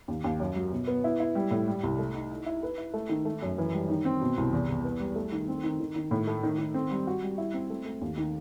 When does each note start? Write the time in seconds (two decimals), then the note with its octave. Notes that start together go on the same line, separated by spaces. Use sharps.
0.08 D#2
0.24 D#2
0.40 F#2
0.56 F#3
0.72 B2
0.87 B3
1.04 E4
1.20 E4
1.35 G3
1.51 A2
1.67 G3
1.83 C2
1.99 A3
2.14 D#4
2.31 E4
2.46 E4
2.63 B4
2.78 E4
2.94 A3
3.09 D#3
3.25 A3
3.42 F#2
3.58 E3
3.73 G3
3.89 D#3
4.05 C4
4.21 B2
4.38 C2
4.53 E2
4.69 E2
4.84 B3
5.00 G3
5.16 A3
5.32 D#3
5.48 C4
5.64 D#3
5.80 D#3
5.96 D#3
6.11 A2
6.27 A3
6.43 D#3
6.58 D#3
6.74 C4
6.91 G3
7.07 F#4
7.23 G3
7.38 E4
7.54 C4
7.70 A3
7.85 A3
8.01 D#2
8.18 D#3